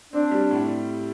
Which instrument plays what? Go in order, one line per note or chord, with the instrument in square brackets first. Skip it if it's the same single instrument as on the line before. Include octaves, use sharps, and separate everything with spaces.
[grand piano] C4 [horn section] D4
[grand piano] G3
A2